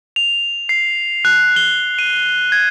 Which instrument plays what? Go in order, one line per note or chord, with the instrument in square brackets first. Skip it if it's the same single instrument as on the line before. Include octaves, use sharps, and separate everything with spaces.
[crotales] F7
C7
F#6
G7
D#7
G#6